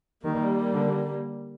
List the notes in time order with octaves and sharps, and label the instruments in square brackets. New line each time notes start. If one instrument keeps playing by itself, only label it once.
[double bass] D#3 [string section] G3 A#3
[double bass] D3